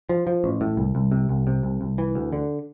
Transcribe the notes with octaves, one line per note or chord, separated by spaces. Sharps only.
F3
F3
A1
A2
C2
C2
C3
C2
C3
C2
C2
E3
D2
D3